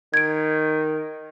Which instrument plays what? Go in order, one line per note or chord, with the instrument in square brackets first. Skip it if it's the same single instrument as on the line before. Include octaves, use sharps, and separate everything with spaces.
[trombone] D#3 [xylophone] G#6 D7